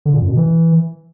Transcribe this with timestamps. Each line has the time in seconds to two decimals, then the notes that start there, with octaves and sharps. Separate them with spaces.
0.06 D3
0.13 A#2
0.21 F#2
0.29 B2
0.37 E3